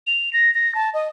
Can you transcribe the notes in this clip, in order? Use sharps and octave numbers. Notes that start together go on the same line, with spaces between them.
F7
A#6
A#6
A5
D#5